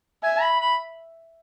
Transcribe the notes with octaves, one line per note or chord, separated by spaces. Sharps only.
E5 G#5
B5
B5